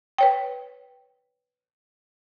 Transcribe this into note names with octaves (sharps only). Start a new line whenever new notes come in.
B4 C#5 G5